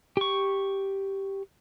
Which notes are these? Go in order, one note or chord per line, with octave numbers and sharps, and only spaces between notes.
G4 C#6